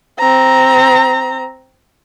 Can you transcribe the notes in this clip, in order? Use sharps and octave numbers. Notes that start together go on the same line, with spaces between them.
C4 A#5